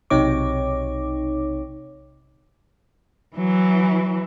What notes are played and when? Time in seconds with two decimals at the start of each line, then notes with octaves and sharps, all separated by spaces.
0.10 B1 C3 D#4 C#5 D6
3.36 E3 F#3